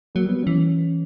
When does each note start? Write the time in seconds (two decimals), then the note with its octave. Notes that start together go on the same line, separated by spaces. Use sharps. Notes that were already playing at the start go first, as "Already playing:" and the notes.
0.15 F#3 A#3
0.25 G3
0.29 B3
0.36 F#3
0.44 E3 C#4